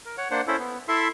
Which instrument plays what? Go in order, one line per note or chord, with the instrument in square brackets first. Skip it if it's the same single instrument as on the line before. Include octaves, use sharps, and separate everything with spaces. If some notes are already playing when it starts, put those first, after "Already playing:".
[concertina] A#4
C#5 F#5
A#3 D4 C5 F#5
C#4 E4 A4 C5
B3
E4 A4 E5 C6